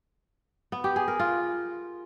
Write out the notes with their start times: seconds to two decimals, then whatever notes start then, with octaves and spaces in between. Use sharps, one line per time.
0.72 B3
0.84 G4
0.96 G#4
1.08 A#4
1.19 F4